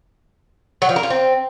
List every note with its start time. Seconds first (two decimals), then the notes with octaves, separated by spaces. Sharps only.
0.82 F#3
0.89 F3
0.96 A#4
1.03 F4
1.10 C4